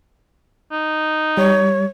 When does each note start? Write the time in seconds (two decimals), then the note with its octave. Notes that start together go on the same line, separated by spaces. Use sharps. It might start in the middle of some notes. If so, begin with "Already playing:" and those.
0.72 D#4
1.37 G3 C#5